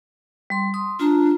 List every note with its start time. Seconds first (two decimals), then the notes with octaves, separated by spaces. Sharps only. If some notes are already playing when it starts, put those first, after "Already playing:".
0.50 G3 C6
0.74 C6 D#6
1.00 D4 F4 A#5